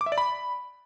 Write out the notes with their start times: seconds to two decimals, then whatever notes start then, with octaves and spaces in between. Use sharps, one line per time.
0.01 D6
0.06 E5
0.12 D5
0.18 B5